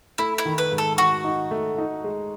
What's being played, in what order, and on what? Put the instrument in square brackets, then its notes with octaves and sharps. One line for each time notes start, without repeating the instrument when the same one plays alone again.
[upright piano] A3 [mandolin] E4
[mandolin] E4
[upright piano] D#3
[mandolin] B4
[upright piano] G#2
[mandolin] A4
[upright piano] D#3 [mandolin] F#4
[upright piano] D#4
A3
D#4
G#3